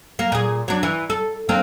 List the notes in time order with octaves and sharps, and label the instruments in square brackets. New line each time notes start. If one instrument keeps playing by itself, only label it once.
[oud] A#3
A#2 G#4
F#3 D4
E3
A4
A#3 C4 D4